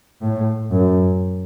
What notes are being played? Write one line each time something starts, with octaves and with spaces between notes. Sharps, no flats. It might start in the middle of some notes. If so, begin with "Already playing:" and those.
A2
F#2